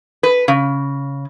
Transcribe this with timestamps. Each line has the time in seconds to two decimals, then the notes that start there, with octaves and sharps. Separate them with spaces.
0.23 B4
0.48 C#3